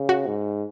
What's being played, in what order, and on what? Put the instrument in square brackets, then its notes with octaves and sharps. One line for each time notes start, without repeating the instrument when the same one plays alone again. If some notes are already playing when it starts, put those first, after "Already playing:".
Already playing: [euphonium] C#3
[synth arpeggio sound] F#4
[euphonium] G#2